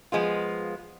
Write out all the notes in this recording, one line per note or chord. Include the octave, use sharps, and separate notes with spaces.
F3 G#3 B3 F4